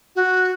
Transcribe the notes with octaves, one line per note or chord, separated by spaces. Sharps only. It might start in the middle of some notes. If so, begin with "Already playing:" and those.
F#4